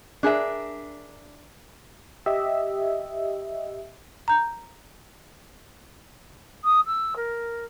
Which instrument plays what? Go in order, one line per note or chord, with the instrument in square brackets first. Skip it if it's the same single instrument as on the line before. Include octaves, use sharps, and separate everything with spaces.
[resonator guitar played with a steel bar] D4 G#4 A#4 E5
[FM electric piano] G4 D#5 E5
[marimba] A#5 G6
[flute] D#6
E6
A#4